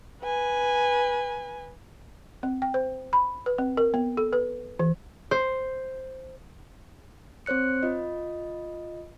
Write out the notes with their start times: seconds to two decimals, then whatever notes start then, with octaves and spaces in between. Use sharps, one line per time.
0.22 B4 G#5
2.43 C4
2.62 G5
2.74 C5
3.13 B5
3.46 B4
3.58 C4
3.77 A#4
3.94 B3
4.17 A4
4.33 B4
4.79 E3
5.31 C5
7.46 C4 C5 C#5 F#6 C#7
7.83 F4 D#5